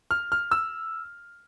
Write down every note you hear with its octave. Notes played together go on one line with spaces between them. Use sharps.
F6
F6
E6